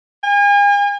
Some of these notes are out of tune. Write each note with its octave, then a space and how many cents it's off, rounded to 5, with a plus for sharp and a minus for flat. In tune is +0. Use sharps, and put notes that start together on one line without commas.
G#5 -40